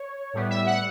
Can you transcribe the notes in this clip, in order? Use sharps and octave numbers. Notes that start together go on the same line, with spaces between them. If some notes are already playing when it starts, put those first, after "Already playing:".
Already playing: C#5
A2 G3 B3
E5
F#5